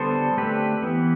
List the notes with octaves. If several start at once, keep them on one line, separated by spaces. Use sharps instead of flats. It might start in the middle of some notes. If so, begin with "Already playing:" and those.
Already playing: D3 G3 B3 A4 C5
D3 A3 C4 G4 B4
E3 B3